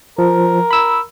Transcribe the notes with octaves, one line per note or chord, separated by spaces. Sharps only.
F3 A#4
B5 E6